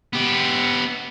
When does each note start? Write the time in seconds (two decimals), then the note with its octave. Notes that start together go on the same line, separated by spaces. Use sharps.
0.13 B3 G4